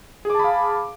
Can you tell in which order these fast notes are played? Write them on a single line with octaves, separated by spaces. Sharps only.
G#4 D6 A5 B5 F5